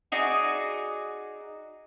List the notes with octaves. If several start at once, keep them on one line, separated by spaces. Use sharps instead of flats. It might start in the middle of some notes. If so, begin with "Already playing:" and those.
D#4 F#4 G#4 D5